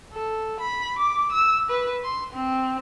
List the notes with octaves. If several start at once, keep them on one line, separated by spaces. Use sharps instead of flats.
A4
B5
D6
E6
B4
C6
C4